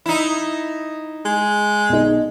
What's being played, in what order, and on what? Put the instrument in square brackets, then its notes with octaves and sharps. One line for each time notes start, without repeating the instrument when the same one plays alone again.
[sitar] D#4 E4
[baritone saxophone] G#3
[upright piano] B1 D#4